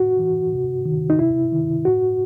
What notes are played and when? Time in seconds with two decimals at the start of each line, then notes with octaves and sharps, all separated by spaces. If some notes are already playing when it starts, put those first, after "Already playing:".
Already playing: A2 F#4
0.19 E3
0.52 C3
0.85 D#3
1.10 D#4
1.19 C3 E4
1.52 D#3
1.85 A2 F#4